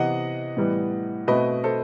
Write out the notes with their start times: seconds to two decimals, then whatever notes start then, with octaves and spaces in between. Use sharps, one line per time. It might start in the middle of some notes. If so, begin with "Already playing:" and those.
Already playing: C3 E3 B3 D#5 F#5
0.57 A2 E3 G3 B3
1.28 B2 A3 C4 B4 D#5
1.64 A4 C5